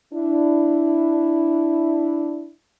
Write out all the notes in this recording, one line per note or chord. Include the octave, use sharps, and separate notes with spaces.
D4 E4